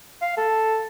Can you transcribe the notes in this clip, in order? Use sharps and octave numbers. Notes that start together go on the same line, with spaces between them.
F5
A4